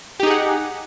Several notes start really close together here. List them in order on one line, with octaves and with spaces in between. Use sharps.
G4 D#4 G#4 F#5